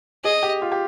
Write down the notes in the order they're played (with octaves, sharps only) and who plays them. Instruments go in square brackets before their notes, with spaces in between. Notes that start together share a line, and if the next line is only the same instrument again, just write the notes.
[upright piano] G#4 [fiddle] D#5
[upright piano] G4
F4
G4